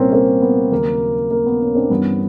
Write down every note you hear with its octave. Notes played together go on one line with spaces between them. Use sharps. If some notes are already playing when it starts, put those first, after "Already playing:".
Already playing: C2 A#2 G3 A#3 C4 C#4
A#3 C4
B3
D#2 C#3 F#3 A#3
A#3
B3
B3 C#4
C4 D4
G2 E3 G3 B3 C#4